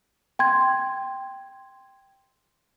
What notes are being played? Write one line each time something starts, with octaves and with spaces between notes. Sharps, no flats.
G5 C6 G#6